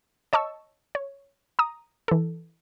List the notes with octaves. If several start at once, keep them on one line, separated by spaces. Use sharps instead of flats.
C#5 D#5 A5 C#6 E6
C#5
A#5 D#6
E3 A4